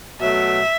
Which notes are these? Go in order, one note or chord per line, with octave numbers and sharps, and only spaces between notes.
B2 F#3 A3 E5